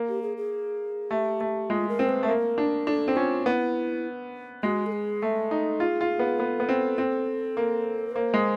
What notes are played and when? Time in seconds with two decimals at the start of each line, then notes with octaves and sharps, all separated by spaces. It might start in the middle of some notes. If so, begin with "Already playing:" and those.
Already playing: A#3
0.08 G4
0.22 G#4
0.37 G#4
1.10 A3 G4
1.41 A3
1.70 G#3 F4
1.89 A#4
1.99 C4
2.09 B4
2.23 A3
2.28 A#3 A#4
2.58 D4
2.87 D4 A4
3.08 C4
3.16 C#4 F4
3.46 B3 E4
4.63 G#3 F#4
4.86 A4
4.92 G#4
5.22 A3 A4
5.51 D#4
5.80 F4 G#4
6.01 F4
6.19 B3
6.39 B3 A4
6.60 B3
6.69 C4
6.98 C4
7.57 A#3
8.16 A#3 C5
8.34 G#3